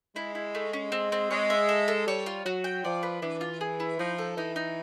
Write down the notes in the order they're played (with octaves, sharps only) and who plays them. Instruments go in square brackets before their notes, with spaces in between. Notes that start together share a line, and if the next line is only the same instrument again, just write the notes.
[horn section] G#3 [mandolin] E4
[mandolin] E4
A3
C#4
C4
C4
[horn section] G#3 [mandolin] C#5
[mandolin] E5
A4
A4
[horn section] G3 [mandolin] C#5
[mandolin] F4
[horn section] F#3 [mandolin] F#4
[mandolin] G5
[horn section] F3 [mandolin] D5
[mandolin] B4
[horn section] E3 [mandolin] D4
[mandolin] F4
G#4
E4
[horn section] F3 [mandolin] D#4
[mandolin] A4
[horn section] E3 [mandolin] D#4
[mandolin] D#4